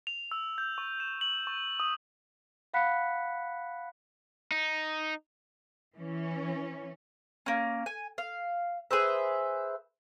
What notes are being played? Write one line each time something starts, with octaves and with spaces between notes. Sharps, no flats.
F7
E6
G6
C#6
E7
F#7
C#6
D#6
F5 F#5 B5 F#6 B6 C#7
D#4
E3 C#4
A#3 C#4
G#5
F5
G#4 B4 C5 E5